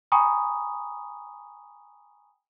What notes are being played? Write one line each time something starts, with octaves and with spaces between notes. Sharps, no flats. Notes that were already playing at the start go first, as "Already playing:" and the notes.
G5 G#5 A#5 B5 C#6 D#6